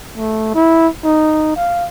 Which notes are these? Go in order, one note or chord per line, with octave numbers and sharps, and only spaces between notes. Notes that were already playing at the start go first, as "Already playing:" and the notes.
A3
E4
D#4
F5